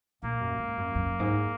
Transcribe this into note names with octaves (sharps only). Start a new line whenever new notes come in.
A#2 A#3
F#2
G#2
F#2
F#2
G#2